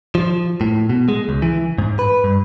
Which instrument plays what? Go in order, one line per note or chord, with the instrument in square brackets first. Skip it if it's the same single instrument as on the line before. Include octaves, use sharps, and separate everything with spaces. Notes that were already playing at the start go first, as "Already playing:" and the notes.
[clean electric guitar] F3
A2
B2
G#3
C#2
E3
G#2
B4
G2